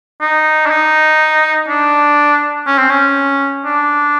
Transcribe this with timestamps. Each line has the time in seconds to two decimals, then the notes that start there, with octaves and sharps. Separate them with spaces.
0.21 D#4
0.66 D4
0.70 D#4
1.68 D4
2.67 C#4
2.78 C4
2.90 C#4
3.65 D4